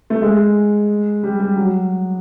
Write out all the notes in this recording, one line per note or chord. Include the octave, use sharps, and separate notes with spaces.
A3
G#3
G3
G3
F#3